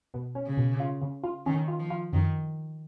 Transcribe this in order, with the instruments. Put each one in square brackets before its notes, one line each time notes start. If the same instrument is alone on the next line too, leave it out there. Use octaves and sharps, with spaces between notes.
[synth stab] B2
C#4
[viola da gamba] C#3
[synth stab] B2
F4
C#3
F4
[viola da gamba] D#3 [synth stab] C#4
[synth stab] F4
[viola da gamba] F3
[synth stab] F4
[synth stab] F#2 [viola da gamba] D#3